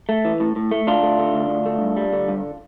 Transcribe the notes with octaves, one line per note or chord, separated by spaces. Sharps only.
A3
E3
A2
A2
A3
D2 D4 F4
A3
D3
D2
D2
A3
G2
G3
D3
G2